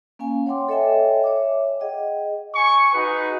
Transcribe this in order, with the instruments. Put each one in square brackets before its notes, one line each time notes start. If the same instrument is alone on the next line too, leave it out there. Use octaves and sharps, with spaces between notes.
[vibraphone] A#3 C#4 F5 G#5
C#5 F#5 G5 C6 D6
A4 C#5 D#5 E5 G5 G#5
C#5 E5 D6
G#4 D#5 F#5 G5
[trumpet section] G#5 C#6
D#4 F#4 G#4 B4